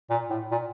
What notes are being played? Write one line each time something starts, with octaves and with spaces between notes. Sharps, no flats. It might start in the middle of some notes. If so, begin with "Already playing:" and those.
A#2
A2
A#2